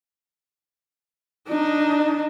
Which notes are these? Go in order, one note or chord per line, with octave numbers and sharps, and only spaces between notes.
D4 D#4